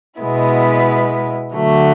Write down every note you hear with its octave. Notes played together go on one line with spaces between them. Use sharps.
B2 G#3 B3 E4
D3 F#3 A3